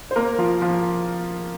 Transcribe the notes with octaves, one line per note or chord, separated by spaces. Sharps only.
C5
A#3 A#4
F3 F4
F3 F4